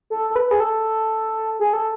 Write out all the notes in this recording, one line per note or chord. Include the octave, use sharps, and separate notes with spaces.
A4
A4
B4
G#4
A4
G#4
A4